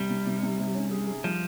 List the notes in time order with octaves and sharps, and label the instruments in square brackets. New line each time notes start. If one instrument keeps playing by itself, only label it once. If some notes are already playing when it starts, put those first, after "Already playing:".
Already playing: [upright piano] C3 [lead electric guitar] G3
[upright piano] C3
C3
C3
C3
C#4
G#4
G#4
[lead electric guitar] F3 [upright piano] G3